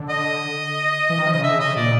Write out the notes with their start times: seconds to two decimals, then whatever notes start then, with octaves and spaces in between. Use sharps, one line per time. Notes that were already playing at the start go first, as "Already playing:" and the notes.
Already playing: D3
0.09 D#5
1.10 E3
1.18 D#3
1.26 F3
1.32 C#3 D#5
1.43 D3 E5
1.54 C#3
1.60 D#5
1.65 C#3
1.76 A#2 D5